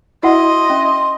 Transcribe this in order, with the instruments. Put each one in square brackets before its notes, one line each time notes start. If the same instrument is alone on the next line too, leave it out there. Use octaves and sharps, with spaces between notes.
[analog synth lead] E4 [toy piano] F#4 C5 F#5 [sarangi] D#5 [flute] C6
[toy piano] C#4